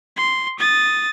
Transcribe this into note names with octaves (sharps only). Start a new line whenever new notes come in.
C6
D#6 A6